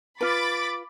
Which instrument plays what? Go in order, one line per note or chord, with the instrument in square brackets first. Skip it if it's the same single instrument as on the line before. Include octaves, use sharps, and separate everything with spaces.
[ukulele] F4 B4 [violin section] B5 D6 A6